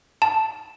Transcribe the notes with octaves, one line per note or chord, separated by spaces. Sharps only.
A5